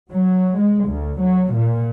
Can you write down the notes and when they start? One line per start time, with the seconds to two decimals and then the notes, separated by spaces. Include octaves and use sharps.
0.11 F#3
0.56 G#3
0.87 D2
1.20 F#3
1.53 A#2